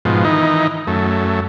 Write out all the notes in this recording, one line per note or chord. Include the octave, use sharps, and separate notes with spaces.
G#2 B2 F3
D#3 E3 D#4
F#2 A3